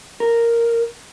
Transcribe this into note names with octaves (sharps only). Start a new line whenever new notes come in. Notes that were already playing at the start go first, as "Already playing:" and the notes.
A#4